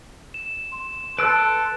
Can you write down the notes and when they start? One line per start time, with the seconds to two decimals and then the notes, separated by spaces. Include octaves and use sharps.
0.34 E7
0.72 C6
1.19 A4 B4 E6 F#6 D7